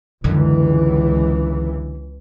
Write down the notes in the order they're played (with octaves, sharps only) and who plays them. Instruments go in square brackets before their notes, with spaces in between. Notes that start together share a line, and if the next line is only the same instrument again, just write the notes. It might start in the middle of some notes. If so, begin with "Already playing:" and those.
[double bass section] C#2 E3 [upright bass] F#2 D3